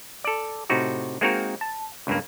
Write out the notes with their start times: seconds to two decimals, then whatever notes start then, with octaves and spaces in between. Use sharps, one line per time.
0.24 A4 D5
0.70 A2 C3 D#4 F#4
1.21 G#3 A#3 C4 D#4 F#4 A#4
1.61 A5
2.07 C#2 G2 A#3